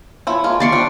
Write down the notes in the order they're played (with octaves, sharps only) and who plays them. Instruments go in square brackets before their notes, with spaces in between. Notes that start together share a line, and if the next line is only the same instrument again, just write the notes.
[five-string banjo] F3 E4 C#5
G#3 A#3 F4
[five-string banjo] A3 [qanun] D5 C6 C#6
[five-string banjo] F3 G3 D4